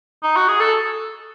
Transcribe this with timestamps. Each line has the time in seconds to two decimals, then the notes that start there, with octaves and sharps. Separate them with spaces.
0.23 D#4
0.36 F#4
0.48 G#4
0.60 A4